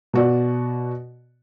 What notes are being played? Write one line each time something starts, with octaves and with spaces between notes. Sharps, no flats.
B2 F#4 D5